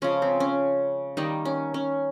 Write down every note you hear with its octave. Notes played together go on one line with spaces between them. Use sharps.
C#3 F3 G#3 C#4
C4
C#4
D#3 G3 A#3 D#4
C#4
C#4